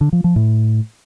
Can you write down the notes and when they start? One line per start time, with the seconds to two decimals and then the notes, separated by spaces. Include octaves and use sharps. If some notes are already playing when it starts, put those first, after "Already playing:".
0.01 D3
0.13 F3
0.24 F3
0.36 A2